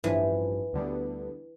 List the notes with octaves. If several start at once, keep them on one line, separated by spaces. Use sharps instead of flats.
A1 G2 E3 F3
D2 D3 G3 B3